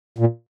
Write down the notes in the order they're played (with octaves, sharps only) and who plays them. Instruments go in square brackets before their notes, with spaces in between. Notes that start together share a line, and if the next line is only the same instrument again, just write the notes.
[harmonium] A#2